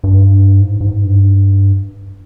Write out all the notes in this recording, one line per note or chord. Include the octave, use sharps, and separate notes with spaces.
G2
G#2
G#2
G2